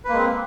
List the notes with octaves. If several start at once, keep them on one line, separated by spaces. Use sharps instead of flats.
G#3 A#3 C4 B4